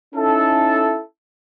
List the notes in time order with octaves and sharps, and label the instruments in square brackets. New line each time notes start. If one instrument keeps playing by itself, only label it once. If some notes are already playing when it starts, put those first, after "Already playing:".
[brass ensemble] C#4 D#4 E4 A4